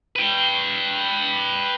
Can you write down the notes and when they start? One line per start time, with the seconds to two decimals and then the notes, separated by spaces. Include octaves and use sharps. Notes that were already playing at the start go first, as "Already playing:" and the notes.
0.16 B4 G5